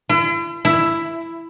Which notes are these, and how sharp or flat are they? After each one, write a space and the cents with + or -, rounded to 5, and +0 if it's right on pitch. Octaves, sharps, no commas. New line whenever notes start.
E4 +45
E4 +10